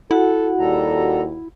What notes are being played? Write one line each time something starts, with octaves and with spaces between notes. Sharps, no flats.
E4 F#4 A4 F#5
D#2 G3 A4 A#5